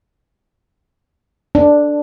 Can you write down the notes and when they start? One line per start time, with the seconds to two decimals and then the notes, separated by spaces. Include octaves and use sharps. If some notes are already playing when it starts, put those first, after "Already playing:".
1.55 D4